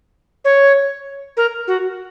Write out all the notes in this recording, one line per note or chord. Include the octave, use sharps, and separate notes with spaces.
C#5
A#4
F#4